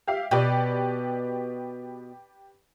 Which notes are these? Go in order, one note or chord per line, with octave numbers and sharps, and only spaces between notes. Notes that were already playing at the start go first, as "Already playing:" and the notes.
G4 E5 F5
B2 G4 B4 D5